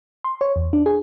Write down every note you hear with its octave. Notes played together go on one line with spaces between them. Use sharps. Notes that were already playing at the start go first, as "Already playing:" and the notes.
C6
C#5
E2
D4
G#4